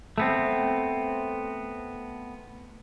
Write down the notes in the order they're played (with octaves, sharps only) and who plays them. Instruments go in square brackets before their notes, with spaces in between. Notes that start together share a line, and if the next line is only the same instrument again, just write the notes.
[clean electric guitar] A3 B3 C4